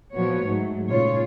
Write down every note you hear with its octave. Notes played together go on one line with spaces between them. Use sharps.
A#2 F3 B3 F#4 C#5
G#2 F#3 A3
A#2 C#3 F4 C#5